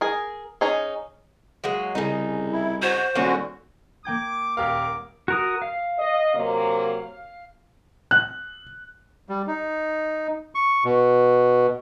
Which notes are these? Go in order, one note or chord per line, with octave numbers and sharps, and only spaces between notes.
G#4 A#4
C#4 D#4 G#4
F#3 G#3 A#3
C2 C#3 D#4
E4
F#4 C5
D#1 D3 A#3 C#4 F#4
A#3 G5 D6 G#6
D#1 G4 A#4 F5 D6
F#4 A#4 D#6
F5
D#5
C3 F#3 A#3
F#6
G3
D#4
C#6
B2